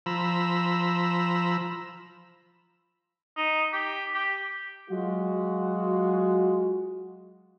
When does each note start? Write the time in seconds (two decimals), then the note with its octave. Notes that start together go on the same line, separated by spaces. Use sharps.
0.06 F3 A#5 B5 E6
3.37 D#4
3.73 G4
4.14 G4
4.90 F#3 G#3 F4 F#4